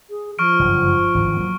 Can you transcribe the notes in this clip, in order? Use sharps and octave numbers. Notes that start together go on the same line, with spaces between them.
G#4
F3 C#6 F6 D7
F#1 G2 D3
G#1 D3 E3
F#3 A#3